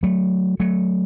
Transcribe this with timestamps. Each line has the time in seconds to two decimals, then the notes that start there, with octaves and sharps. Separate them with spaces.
0.03 F#3 A3
0.60 F#3 A3